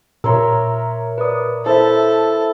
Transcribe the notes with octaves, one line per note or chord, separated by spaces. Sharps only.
A#2 A#4 C#5 E5 A#5 C6 E6
B4 D5 D#6
E4 A4 C5 E5 A5